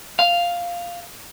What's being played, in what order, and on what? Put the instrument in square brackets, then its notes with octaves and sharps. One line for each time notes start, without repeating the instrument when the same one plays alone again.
[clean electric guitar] F5